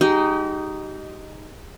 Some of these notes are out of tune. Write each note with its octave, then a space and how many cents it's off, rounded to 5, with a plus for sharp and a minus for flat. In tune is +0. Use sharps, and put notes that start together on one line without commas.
G#3 -15 D#4 +0 G4 -40